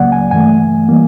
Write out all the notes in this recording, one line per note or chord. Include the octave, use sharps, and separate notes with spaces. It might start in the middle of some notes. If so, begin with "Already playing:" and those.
Already playing: C#2 C#3 F#3 A#3 D5 F#5
G#5
G2 E3 A3 G#5
E3 G3 A#3